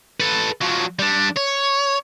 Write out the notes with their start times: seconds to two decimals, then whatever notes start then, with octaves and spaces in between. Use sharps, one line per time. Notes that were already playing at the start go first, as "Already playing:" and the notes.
0.20 A4 B4
0.61 F3 F#3
0.99 G3 D4
1.36 C#5